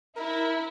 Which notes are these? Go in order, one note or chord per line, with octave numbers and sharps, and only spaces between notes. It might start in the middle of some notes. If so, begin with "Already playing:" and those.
E4 A#4